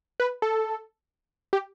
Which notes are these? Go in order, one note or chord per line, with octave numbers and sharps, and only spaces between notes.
B4
A4
G4